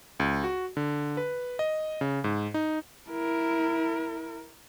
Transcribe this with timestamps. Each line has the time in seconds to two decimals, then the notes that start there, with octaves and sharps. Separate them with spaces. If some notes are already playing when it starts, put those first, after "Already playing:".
0.20 C#2
0.44 F#4
0.77 D3
1.17 B4
1.59 D#5
2.01 C#3
2.24 G#2
2.54 D#4
3.10 E4 A#4